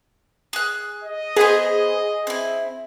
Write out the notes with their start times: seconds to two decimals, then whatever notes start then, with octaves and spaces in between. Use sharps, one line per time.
0.53 G#4 F#6
1.04 D#5
1.36 B3 G#4 C5
2.27 C4 E4